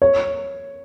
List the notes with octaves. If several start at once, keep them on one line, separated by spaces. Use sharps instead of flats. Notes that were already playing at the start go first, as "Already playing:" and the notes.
C#5